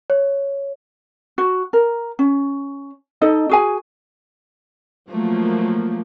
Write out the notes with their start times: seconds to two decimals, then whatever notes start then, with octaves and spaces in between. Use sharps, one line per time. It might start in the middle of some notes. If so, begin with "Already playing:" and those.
0.10 C#5
1.38 F#4
1.73 A#4
2.19 C#4
3.21 D#4 A4 D#5
3.49 F#4 G#4 G#5
5.10 F3 F#3 A3 A#3